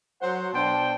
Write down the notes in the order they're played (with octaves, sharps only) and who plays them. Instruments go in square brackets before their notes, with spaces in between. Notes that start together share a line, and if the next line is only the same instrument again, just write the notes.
[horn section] F#3 C5 F#5
B2 D4 C5 G5 A5 C6